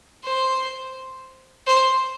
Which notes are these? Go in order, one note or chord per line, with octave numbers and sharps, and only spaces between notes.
C5
C5